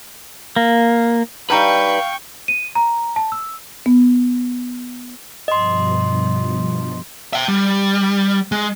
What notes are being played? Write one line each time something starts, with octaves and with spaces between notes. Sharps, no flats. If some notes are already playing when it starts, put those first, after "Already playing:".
A#3
G3 D#4 B4 F5 G5 A5 C#6
D#7
A#5
A5
E6
B3
G2 B2 F3 D#5 C6
E5 G5
G3
G#3